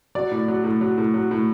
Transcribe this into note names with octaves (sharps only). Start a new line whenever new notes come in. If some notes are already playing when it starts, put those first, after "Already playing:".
F#3 D5
A2
F#3
A2
F#3
A2
F#3
A2